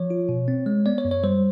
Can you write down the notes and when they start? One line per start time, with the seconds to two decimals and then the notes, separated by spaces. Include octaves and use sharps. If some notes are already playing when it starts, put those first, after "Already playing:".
Already playing: F3 C#5
0.10 F4
0.29 B2
0.48 C4
0.66 G#3
0.86 B3 D5
0.98 C#5
1.05 F#2
1.11 C#5
1.23 G3 C5